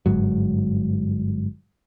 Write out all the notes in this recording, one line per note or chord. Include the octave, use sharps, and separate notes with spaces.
G1 G#2 F#3